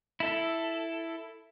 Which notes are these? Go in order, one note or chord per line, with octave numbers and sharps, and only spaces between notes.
E4 A4